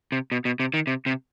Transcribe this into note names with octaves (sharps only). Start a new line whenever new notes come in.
C3
B2
B2
C3
D#3
C3
C3